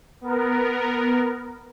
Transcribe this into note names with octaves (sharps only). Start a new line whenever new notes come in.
B3 A#4